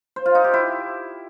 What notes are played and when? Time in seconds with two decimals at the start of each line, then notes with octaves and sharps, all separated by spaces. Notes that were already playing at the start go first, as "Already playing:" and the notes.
0.16 C5
0.26 F4
0.35 D#4
0.44 G4
0.54 E4